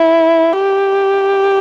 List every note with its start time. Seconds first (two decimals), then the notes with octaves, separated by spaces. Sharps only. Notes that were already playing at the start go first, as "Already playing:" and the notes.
Already playing: E4
0.53 G4